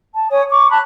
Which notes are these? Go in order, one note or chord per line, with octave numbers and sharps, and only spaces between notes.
A5
C#5 G#5 D#6
C#6 D6
A5 B5 F#6